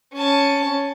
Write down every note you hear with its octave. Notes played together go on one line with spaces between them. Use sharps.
C#4 A5